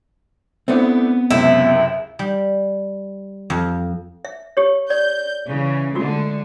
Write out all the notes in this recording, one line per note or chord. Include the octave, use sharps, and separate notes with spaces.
A3 B3 C4 D4 E4
C#2 F#2 C3 E4
G3
F2
E5
G4 C#5
D5 G6
C#3 E3
D3 G#3 A3 F4 F#4